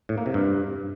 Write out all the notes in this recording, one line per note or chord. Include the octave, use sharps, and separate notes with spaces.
A2
A#3
C3
G2